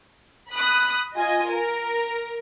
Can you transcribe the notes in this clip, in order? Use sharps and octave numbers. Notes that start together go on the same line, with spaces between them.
B5 D#6 F#6
F4 D#5 G#5
A#4